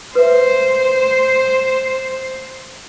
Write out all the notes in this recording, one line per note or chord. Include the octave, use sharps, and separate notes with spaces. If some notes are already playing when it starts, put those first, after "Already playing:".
B4 C5 E5